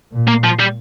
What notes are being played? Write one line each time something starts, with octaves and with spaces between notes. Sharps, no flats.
A#2
A#3
F3
G3